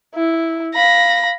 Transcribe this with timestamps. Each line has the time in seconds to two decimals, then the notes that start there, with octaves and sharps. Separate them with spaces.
0.15 E4
0.75 F5 B5 A#6